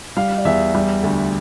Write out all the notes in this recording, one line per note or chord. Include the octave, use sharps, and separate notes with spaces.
G3 F5
D5
E2 E5
G3
D2